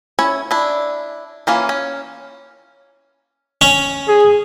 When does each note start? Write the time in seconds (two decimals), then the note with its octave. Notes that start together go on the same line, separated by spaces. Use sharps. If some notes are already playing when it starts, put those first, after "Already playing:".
0.19 C#4 E4 C#5
0.51 D4 E4
1.47 E3 A#3 C#4 F4
1.69 C#4
3.61 C#4
4.08 G#4